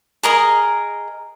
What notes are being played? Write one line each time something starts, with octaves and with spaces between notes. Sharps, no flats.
G#4 A#4 D#5 A#5